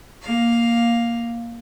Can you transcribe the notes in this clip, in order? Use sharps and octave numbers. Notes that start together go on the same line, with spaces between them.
A#3 F5